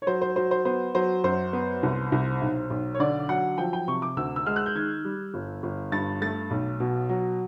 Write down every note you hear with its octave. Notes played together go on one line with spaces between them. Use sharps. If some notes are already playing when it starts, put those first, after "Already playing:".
C#5
F#3 C5
C5
F#3 C5
C5
B3 C5
F#3 C5
F#2 C5
B3
C2
C2
B1
B1
C#5
D3 D5
F#3 F#5
F3 G5
G5
C3 C#6
D6
D2 E6
E6
G#3 F6
F#6
G6
D#3 G#6
G3
G1
G1
G2 A6
A3 A6
B1
B2
F#3